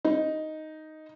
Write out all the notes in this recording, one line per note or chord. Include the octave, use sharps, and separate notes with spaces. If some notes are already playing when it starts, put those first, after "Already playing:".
D#4